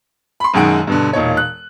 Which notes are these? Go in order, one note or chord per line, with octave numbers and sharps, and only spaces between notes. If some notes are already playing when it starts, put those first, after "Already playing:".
B5 C6
B1 F#2 D#3 G#3 F#5 D7
G2 B2 D3
E1 A#2 D#4 C#5
F#6